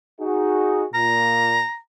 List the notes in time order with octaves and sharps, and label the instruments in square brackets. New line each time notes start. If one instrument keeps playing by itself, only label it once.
[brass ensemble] D#4 F#4 G#4
[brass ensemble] A#2 [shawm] A#5